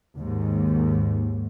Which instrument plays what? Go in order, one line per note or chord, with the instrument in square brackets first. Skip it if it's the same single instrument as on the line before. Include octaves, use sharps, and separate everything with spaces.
[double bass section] D#2 G#2